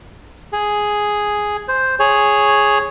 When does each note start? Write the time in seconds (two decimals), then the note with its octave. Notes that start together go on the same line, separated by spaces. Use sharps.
0.53 G#4
1.68 C5
1.99 G#4 C#5